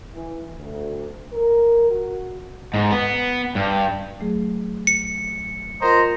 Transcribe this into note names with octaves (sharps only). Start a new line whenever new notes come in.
E3
D2
A#4
F#4
G#2
B3
G2
F#3 A3 G#4
C#7
F4 A#4 C5 D#5 F#5 A#5